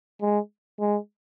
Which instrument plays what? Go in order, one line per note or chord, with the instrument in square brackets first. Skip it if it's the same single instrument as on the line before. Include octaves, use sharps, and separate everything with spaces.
[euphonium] G#3
G#3